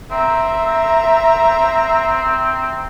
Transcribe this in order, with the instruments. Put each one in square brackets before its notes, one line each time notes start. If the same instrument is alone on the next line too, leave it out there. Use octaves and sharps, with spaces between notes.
[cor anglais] C4 [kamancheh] E5 A#5